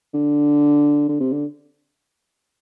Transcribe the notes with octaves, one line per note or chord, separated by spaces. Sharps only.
D3
D3
C3
D3